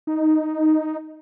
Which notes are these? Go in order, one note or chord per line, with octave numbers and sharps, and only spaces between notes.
D#4